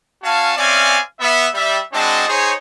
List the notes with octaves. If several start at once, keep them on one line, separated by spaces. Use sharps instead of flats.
C#4 F#4 F5 G#5 A5
C4 C#4 D5 E5 F5 G#5
B3 E5
G3 E5
G#3 C4 D4 F#4 D#5 A5
D#4 G#4 C5 C#5